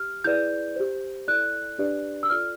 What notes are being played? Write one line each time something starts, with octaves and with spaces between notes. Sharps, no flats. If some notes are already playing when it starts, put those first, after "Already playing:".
Already playing: G4 F6
E4 G#4 B4 D5 G6
G4 C5
E4 A4 D5 F#6
D4 G4 B4 D5
E6
F4 A4 D5 F6